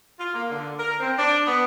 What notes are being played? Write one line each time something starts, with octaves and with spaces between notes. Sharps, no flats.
F4
A#3
D3
A#4
C4
D4
B3